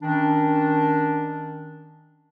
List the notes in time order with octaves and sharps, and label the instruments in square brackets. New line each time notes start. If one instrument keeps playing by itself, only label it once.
[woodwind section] D#3 C#4 D4